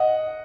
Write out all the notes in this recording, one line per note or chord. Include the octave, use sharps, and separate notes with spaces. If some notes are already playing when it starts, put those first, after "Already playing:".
Already playing: D#5 F#5